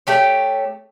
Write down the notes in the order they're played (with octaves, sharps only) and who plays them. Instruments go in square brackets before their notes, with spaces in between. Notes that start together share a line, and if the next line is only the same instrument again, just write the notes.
[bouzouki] A3 G4 C#5